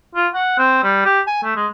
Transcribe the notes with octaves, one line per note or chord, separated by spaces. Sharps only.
F4
F#5
C4
G3
G4
G#5
A3
G#3